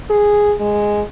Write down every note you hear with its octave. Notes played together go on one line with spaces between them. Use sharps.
G#4
G#3